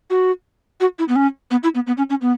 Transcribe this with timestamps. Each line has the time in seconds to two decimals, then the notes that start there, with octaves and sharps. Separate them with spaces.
0.10 F#4
0.80 F#4
0.99 E4
1.08 B3
1.16 C#4
1.51 B3
1.63 E4
1.75 B3
1.87 B3
1.97 C#4
2.10 C#4
2.21 B3